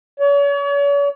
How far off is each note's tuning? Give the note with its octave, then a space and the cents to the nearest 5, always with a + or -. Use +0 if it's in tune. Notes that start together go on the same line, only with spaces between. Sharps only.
C#5 +40